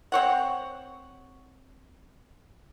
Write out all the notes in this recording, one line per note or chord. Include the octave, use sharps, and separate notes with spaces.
C4 C#5 F#5